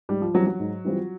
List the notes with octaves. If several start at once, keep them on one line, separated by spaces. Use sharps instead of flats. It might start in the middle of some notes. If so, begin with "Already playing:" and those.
G#2 G3
F3
E3 F#3 G3 C4 F4
F#3
G#2
E3 G3 C4 F4